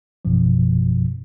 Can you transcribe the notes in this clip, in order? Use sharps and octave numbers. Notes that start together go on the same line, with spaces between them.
A1 F#2 B2 F3